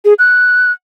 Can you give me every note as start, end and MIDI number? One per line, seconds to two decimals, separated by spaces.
0.05 0.14 68
0.19 0.71 90